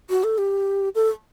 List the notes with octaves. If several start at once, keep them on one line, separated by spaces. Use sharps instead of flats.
F#4
A4
G4
A4